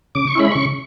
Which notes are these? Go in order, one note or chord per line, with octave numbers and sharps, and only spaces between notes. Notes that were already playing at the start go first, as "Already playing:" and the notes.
C#3 D6
C#6
G#3 C#4 E4 B5
C#3 C#6